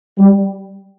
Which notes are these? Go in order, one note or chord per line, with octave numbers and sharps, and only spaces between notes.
G3